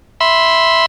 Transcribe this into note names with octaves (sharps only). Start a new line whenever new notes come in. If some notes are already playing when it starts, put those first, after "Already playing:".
E5 B5 C6